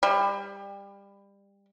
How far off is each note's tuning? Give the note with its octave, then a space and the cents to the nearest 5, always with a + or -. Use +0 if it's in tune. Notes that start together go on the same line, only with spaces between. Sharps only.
G3 +25